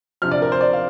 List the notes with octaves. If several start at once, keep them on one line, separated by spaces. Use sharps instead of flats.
D2 C3 F3 F6
D5
A#4
C5
D5
F5